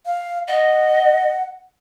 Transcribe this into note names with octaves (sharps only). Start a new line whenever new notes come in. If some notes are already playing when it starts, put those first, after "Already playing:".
F5
D#5 F#5